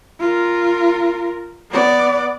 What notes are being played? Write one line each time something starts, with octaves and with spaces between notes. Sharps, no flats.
F4 A#4
B3 D5